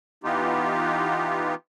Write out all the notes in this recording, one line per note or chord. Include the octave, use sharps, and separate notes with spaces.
E3 B3 D#4 F4 G4